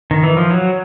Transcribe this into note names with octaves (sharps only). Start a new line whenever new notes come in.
D#3
E3
F3
F#3